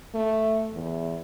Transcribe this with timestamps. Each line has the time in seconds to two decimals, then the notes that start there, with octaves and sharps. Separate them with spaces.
0.14 A3
0.74 E2